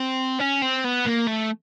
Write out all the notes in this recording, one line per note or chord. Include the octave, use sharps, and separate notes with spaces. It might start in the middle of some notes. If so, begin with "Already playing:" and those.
Already playing: C4
C#4
C4
B3
A#3
A3